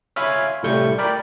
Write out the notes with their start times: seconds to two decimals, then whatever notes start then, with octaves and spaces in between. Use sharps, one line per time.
0.16 C#5 E5 F5 G#5 B5 C6
0.63 C2 A2 G3 A3 C#6 G6
0.98 A#4 D5 G5 B5